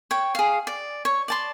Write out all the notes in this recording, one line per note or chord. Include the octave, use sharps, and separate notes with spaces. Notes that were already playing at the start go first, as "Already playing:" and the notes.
C#5 G5
G#4 F5
D5
C#5
D5 A5 C6